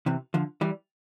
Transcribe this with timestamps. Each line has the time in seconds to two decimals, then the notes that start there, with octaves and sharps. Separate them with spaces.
0.06 C3 E3
0.34 D3 F3
0.61 E3 G3